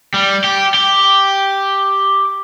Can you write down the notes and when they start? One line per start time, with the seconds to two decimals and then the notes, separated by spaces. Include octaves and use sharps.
0.14 G3
0.44 G4
0.74 G4